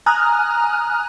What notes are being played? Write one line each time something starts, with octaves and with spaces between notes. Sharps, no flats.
G#5 A#5 D#6 F6 F#6